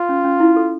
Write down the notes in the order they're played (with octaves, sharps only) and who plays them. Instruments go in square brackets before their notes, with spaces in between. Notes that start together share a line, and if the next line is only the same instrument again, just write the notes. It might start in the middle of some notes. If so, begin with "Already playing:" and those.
Already playing: [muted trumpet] F4
[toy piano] C#4
C#4
E4
A4